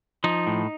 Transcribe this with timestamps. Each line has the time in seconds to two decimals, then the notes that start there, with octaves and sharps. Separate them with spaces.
0.24 F3 D#4
0.47 A2